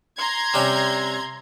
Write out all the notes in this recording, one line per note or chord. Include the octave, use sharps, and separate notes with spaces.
A#5 C6 G#6
C3 G3 C#4